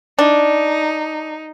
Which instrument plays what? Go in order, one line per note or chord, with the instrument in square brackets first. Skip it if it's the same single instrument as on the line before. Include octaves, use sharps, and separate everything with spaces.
[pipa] D4 [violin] D#4